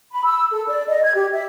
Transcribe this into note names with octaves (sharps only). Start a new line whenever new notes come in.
B5
E6
A4
D5
D#5
G#6
G4
E5